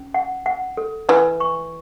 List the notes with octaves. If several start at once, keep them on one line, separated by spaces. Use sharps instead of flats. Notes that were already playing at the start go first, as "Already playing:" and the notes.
Already playing: C#4
F#5
F#5
A4
E3 B4
C#6